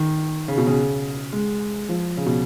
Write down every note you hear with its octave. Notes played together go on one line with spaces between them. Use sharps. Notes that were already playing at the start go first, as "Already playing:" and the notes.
Already playing: D#3
C#3
B2
C#3
G#3
F3
C#3
B2